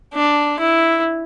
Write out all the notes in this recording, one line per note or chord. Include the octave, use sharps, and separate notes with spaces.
D4
E4